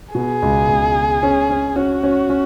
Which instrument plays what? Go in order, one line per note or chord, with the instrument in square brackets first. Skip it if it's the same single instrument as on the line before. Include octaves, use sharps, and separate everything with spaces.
[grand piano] B2 [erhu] G#4
[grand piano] C#2
C#2
G#3
C#4
C#4
[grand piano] C#4 [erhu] F#4
[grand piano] C#4
C#4